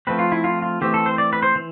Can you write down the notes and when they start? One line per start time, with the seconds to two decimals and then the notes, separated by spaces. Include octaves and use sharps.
0.07 F3 A3 C4 B4
0.19 F4
0.32 E4
0.44 F4
0.62 F4
0.81 E3 A3 C4 G4
0.94 A4
1.06 C5
1.18 D5
1.33 B4
1.43 C5
1.56 E3